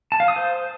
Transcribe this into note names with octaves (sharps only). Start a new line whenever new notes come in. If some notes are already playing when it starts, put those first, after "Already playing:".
A5
F5
D#6
C5